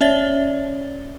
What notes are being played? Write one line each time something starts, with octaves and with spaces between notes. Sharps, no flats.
C#4 C#5 D5 E5 A6 G7